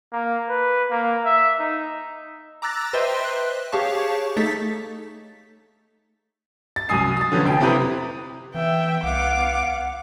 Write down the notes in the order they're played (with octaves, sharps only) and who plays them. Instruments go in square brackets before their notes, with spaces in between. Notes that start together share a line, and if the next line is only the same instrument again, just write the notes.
[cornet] A#3
B4
A#3
E5
D#4
[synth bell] A#5 D6 E6 F#6 A6 A#6
B4 C5 D#5 E5 G5 C6
F#6
G4 G#4 C#5 F5 A5 C#6
A3 D#4 A4 A6 B6
[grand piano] A6
C2 F#2 G#5 D#6 C7
D#6 A6
D3 F3 F#3 B3 C#4
F1 G5
C3 C4 E4 G4 B4 A#5
[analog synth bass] E3 [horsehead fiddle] B3 E5 [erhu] G5
[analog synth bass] C2 [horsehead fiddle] B3 F5 [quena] F#5 [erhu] D6